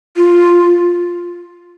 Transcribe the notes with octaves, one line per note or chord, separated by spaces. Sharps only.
F4